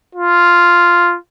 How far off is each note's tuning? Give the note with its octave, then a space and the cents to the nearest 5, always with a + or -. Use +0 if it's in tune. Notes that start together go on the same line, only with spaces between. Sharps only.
F4 -5